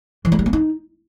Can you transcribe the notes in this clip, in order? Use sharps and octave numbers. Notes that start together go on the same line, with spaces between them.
E3
A3
G3
A#3
D#4